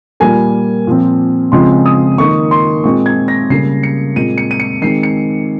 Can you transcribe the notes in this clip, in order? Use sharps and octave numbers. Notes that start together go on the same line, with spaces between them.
A#2 G3 A#3 G#5
A#2 F3 C4
C#3 F3 G#3 C4 C6
D#6
D#3 A#3 C#6
C6
A#2 G#3 C4 C#6
G#6
A#6
C#3 G3 A#3 C7
C#7
A#2 G#3 C4 D#7
C#7
D#7
C#7
D#3 G#3 C4 C7
C#7